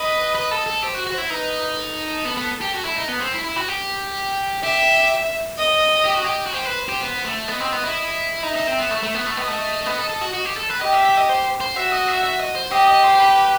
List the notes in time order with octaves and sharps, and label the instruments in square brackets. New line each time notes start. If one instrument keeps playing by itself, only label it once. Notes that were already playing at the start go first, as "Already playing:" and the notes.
Already playing: [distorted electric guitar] B4 [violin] D#5
[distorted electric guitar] B4
A4
A4
[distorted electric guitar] G4 [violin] C5
[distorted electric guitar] F#4
F#4
E4
[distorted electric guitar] D#4 [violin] B4
[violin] A4
[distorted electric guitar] B3
B3
G4
F#4
E4
D#4
B3
C4
E4
E4
F#4
G4
[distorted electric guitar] G4 [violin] E5
[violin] D#5
[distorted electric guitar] G4
F#4
G4
F#4
[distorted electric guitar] G4 [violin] C5
[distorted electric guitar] B4
G4
B3
A3
[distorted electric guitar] B3 [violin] D#5
[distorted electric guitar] C4
B3
E4
[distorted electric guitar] D#4 [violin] E5
[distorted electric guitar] D#4
C4
B3
A3
A3
B3
A3
[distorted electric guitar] B3 [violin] D#5
[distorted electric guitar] A3
B3
A4
A4
F#4
F#4
G4
A4
B4
[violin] G4 [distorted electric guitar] D#5
[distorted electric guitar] E5
E5
D#5
C5
C5
[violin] F#4 [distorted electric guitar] E5
[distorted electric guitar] D#5
E5
E5
D#5
C5
[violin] G4 [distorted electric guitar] D#5
[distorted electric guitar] D#5
C5
C5
B4